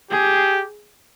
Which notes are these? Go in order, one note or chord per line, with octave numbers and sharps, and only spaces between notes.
G4 G#4